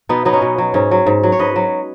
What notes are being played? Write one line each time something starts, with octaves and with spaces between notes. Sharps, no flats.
B2 B3 D#4
F#3 B3 D#4
C#4
B2
F#3
G#2 C#4
F#3
G#2
F#3
C#5
G#2 B4 D#5
F#3